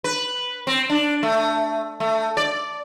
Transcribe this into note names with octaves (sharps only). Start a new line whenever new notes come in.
B4
C4
D4
A3
A3
D5